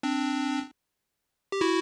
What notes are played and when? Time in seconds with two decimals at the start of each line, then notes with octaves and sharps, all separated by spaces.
0.03 C4 D4
1.52 G4
1.61 E4 F#4